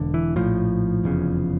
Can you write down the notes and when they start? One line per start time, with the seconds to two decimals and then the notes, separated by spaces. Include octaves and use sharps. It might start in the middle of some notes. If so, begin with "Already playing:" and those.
Already playing: E1 D3
0.14 E3
0.36 A#1 A2 F3
1.03 F1 E2 C#3